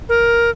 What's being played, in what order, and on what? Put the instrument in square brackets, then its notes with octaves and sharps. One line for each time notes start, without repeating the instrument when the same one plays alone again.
[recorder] A#4